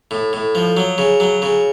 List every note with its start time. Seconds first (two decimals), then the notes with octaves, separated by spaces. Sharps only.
0.11 A2
0.33 A2
0.55 F3
0.77 F#3
0.98 C#3
1.20 F#3
1.42 C#3